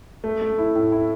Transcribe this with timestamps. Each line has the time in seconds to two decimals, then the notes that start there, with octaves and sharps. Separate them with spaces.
0.24 A3
0.42 A3
0.58 E4
0.75 A2
0.92 E4